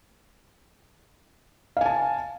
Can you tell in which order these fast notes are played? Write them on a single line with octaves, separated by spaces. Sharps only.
F5 G#5 A5